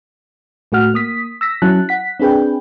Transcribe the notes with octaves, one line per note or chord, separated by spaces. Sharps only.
A2 A3 F#4 F#5 F6
A#3 D#6 B6
E6 A#6 B6
F#3 C#4 E4 A5 F#6
F#5 B6
C4 D4 G#4 B4 G5